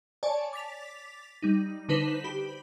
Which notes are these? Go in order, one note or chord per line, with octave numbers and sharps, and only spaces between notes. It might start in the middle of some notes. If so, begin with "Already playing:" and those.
C#5 D5 G#5 A5
D6 A6 B6 F7
G3 D#4
D3 D#4 B4 C5 B6 E7
G4 B5